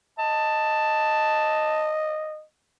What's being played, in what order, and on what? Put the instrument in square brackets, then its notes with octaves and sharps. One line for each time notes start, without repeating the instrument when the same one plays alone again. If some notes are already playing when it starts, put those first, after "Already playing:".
[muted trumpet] D#5 [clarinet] A5